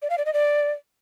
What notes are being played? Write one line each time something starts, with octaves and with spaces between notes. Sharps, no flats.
D5
F5
D5
D#5
D5